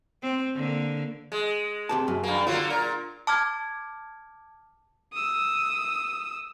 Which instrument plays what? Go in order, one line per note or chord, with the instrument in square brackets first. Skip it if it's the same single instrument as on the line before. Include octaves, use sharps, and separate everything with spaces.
[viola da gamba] C4
D3 A#3
[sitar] G#3
[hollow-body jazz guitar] C3 G4 A5
F#2
[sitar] G2 A#3
[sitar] D3 F#3 A#3 [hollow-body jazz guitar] F4
[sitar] A#2 A#4
[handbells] A5 D6 F6 G#6
[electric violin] D#6 E6